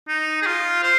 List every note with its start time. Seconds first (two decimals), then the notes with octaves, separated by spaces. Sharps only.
0.08 D#4
0.42 G#4
0.47 F4
0.83 C5